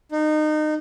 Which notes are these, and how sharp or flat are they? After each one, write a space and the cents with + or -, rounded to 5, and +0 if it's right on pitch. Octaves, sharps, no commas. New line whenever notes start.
D#4 -25